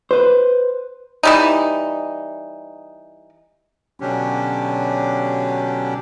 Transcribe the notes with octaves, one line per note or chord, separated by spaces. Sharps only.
B4 C5
E3 G3 D#4
B2 D3 F#3 C#4 D4 G4